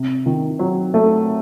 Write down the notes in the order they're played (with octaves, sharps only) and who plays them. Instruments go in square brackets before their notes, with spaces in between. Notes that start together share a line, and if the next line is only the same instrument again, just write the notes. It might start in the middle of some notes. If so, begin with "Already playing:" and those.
Already playing: [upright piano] C3
D#3
F#3
A3